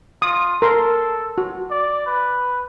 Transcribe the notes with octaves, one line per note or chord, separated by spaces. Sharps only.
F4 D#6
A4 A#4 C6
F#4
D5
B4